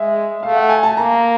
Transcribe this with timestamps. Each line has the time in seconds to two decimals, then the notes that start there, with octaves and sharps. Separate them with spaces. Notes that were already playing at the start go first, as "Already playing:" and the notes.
Already playing: G#3 E5
0.43 A3 F5
0.56 F#5
0.69 G#5
0.83 A5
0.97 A#3 A#5